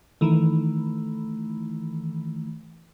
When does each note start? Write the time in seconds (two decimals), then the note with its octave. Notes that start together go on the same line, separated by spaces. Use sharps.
0.21 D#3 E3 A3